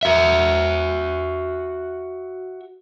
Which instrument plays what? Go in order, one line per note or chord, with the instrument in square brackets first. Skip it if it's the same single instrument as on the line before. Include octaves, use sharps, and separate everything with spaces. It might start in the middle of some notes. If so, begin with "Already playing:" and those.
[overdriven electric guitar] F#4 E5